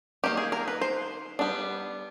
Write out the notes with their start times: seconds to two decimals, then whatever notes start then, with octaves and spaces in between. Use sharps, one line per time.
0.24 D#3 G3 A#3 G4
0.37 G#4
0.52 A#4
0.68 B4
0.81 C5
1.39 G3 B3 D4